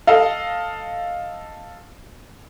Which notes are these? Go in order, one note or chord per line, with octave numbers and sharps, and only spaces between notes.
A4 D#5 F5